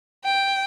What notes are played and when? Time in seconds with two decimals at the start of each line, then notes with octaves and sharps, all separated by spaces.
0.24 G5